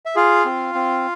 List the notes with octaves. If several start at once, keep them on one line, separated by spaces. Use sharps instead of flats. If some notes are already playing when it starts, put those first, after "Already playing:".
E5
F4 G#4 F5
C4
C4